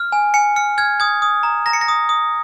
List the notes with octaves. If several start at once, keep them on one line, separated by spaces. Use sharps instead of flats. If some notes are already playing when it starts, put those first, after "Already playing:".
Already playing: F6
G#5
G#5 C#7
F6 C#7
F6 G#6
D#6 G#6
D#6
A#5
A#5 A#6
C#7
A#6
D#6
D#6